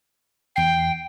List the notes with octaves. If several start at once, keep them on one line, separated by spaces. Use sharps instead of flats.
E2 G5 C7